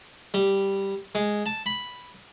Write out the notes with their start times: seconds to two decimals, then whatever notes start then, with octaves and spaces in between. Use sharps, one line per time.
0.34 G3
1.15 G#3
1.46 A5
1.66 B5